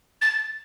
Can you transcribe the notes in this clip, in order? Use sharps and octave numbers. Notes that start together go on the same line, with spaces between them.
A6